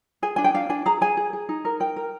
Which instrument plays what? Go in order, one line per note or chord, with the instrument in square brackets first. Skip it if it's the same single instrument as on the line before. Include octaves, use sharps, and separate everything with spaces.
[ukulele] G#4 G#5
D4 G#5
G5
D4 F5
D4 G#5
G#4 A#5
G#4 G#5
G#4
G#4
D#4
A#4
A#4 G5
A#4